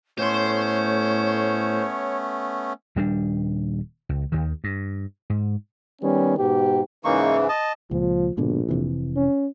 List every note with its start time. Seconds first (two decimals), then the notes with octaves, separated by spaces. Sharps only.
0.19 A2 A3 B3 C#4 C5 C#5 C6
2.96 D#1 G3 D4
4.09 C#2
4.32 D#2 D#3
4.64 G2
5.30 G#2
6.02 D#3 G3 B3 C#4
6.38 G#2 B2 G4
7.05 G#2 C#3 E3 A#3 D#4 C#6
7.49 D#5 A5
7.91 C#2 A#2 F3
8.37 A#1 G#2 B2 D3
8.69 F1 C3 E3
9.16 C#4